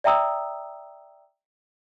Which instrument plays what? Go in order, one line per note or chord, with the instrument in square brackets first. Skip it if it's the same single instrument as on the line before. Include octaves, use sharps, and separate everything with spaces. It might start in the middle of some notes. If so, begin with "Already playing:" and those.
[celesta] D5 E5 G5 A#5 D#6 E6